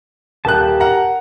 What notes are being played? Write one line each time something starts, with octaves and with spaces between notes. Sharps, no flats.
D#1 A#3 G4 A5 F#6
A#4 F#5 A#5